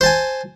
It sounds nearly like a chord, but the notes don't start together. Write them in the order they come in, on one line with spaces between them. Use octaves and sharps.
C5 A5 G#5